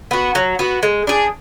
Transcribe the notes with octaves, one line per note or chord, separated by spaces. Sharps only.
B3 F#4
F#3
B3 F#4
G#3
D4 G#4